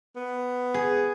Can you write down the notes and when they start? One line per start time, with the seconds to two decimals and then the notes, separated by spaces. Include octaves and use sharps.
0.16 B3
0.74 G#4